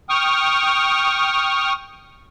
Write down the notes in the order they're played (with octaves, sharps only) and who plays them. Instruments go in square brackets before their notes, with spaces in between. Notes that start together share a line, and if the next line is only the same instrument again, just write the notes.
[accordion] G5 C#6 D#6 F6